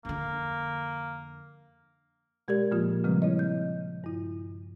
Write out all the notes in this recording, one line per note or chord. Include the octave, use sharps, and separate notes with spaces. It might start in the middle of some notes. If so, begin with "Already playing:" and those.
F2 D3 A#3
B2 G#3 G4 A#4 D5 G#6
A#2 F3 A#3 F4
C#3 F3 G3 G#3 C4
E4 C#5 D#5
G6
G2 E4